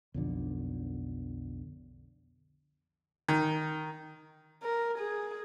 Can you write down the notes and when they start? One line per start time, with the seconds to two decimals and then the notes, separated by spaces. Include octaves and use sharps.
0.14 B1 F2 D3
3.29 D#3
4.63 A#4
4.98 G#4